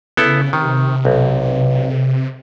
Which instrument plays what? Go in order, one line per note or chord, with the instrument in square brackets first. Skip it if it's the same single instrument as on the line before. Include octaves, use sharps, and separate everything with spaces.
[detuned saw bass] C#3 [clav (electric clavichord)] B3 E4 A4
[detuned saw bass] C3 [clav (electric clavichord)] D#3
[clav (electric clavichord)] B1